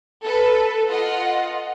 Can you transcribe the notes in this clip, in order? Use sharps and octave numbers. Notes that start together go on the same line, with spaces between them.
A4 B4
F4 D#5 F#5